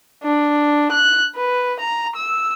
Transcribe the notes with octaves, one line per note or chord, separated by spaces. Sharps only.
D4
F#6
B4
A#5
E6